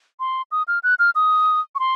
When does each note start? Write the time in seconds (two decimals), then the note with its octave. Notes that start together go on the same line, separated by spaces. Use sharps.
0.20 C6
0.52 D#6
0.68 F6
0.83 F#6
0.99 F6
1.15 D#6
1.75 C#6
1.79 C6